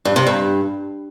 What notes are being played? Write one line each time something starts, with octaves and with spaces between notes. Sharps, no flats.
G2
C3
G2